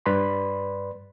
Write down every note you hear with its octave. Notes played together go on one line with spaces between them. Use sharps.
G2 B4 D5 B5 C6